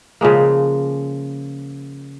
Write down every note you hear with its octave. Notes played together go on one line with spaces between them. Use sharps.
C#3 F3 G#3 A#3